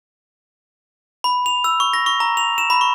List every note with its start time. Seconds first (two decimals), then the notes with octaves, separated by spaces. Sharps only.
1.24 B5
1.46 F7
1.64 E6
1.80 C#6
1.93 A#6
2.06 C#6
2.20 A#5
2.37 F7
2.58 E7
2.70 B5
2.81 C#6